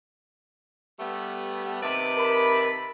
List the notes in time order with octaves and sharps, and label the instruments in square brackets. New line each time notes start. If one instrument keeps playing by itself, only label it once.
[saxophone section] G3 A3 B3
[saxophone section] C3 D#3 B4 [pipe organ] E5 A5 D6
[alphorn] A#4 [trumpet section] B5